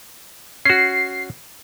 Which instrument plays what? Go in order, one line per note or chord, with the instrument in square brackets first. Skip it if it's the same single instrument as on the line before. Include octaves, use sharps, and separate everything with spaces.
[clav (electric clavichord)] C#4 F#4 [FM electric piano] C7